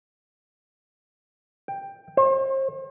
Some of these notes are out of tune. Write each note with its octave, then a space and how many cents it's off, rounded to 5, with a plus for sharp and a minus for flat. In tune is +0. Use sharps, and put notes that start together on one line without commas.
G5 +10
C5 +40